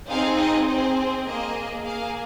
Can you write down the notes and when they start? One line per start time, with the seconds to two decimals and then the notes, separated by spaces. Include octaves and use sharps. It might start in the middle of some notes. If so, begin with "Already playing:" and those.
0.10 C4 D#4 G#4 F5
0.39 D#5
0.68 C4 G#4 C5
1.27 A#3 G#4 D#5
1.85 A#3 G#4 F5